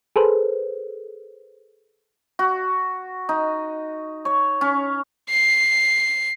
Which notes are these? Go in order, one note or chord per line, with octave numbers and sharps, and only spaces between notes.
G#4 A4 B4 C5
F#4
D#4
C#5
C#4
C7